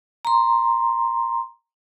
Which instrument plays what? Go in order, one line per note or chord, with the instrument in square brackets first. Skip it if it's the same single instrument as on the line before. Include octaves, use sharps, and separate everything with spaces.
[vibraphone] A#5 C6